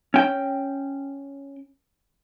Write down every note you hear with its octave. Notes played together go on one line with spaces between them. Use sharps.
C#4 G5